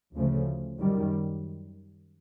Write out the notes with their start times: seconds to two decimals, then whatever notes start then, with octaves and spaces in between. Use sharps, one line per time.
0.14 D2 C#3 F3 A3
0.79 F#2 D#3 G3